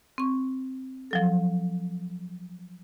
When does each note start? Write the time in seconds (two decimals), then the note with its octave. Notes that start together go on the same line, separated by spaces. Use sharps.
0.18 C4 C#6
1.11 F3 F#3 A4